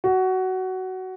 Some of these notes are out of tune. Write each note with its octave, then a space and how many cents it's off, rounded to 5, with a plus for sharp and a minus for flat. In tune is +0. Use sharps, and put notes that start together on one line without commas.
F#4 +15